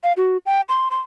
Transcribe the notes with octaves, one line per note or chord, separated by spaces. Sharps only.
F5
F#4
G5
C6
C6